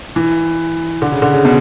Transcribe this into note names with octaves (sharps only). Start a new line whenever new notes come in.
E3
D3
C#3
D3
C#3
B2